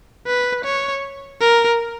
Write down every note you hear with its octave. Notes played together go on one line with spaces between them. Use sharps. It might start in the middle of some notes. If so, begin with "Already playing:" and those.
B4
C#5
A#4